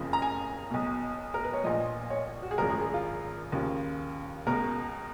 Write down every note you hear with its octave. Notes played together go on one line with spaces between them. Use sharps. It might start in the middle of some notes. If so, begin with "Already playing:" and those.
Already playing: F#1 F2 C#3 F3
A#5
G#5
B1 B2
A#4
B4
C#5
A#1 A#2 F3 D#5
C#5
F#4
G#4
G#1 F#2 F3 A#4
G#4
G#4
F4
D#2 C#3 F3
C#2 B2 A#4